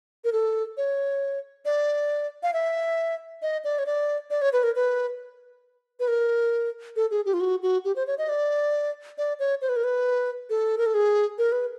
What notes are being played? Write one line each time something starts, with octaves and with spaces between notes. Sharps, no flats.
A#4
A4
C#5
D5
F5
E5
D#5
D5
C#5
D5
D5
C#5
B4
A#4
B4
B4
A#4
A4
G#4
G4
F4
F#4
F#4
G4
C5
C#5
D#5
D5
D5
C#5
C5
B4
A#4
B4
A4
A#4
A4
G#4
A#4
B4